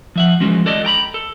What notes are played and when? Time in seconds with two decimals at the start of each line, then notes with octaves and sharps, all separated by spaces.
0.16 F3 E5 F#5
0.40 E3 F3 G#3 C#4 F#4
0.66 F#4 A4 D5 D#5
0.85 G5 A#5 B5
1.14 A4